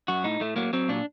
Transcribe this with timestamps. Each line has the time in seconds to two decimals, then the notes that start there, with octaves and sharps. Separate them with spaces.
0.08 F#2 F#4
0.24 A2 D#4
0.40 A2 A3
0.56 F#3 A#3
0.73 F#3 C4
0.89 A#2 D4